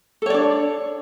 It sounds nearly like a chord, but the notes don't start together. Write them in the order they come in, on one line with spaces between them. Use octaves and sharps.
A4 C#5 D5 D4